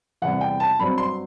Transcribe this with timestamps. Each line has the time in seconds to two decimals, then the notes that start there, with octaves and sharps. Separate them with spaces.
0.22 E2 C3 G3 F#5
0.41 G5
0.60 A5
0.79 G2 F#3 C4 B5
0.98 C6